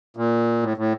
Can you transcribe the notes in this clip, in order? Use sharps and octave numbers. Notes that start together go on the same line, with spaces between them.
A#2
A2
A2